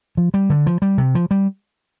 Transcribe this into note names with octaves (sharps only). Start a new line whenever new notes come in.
F3
G3
D3
F3
G3
C3
F3
G3